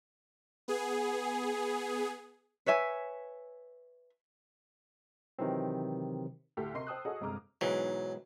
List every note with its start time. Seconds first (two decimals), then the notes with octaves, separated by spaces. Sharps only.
0.68 B3 G#4
2.66 B4 C#5 E5 G#5
5.39 C3 D#3 E3 F#3 C4
6.57 D2 A2 G4 A4
6.74 C3 A#4 D#5 C6 C#6 C7
6.87 C5 G5 A5 D#6 E6 F#6
7.05 F#4 G#4 A4 C#5 D#5 F#5
7.21 G1 C3 G#3 A#5 D6 F6
7.61 B1 G#2 E3 F#3